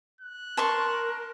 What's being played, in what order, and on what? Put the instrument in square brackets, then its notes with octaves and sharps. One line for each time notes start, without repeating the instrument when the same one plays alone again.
[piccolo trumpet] F#6
[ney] A#4 [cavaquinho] A5 C6 C#6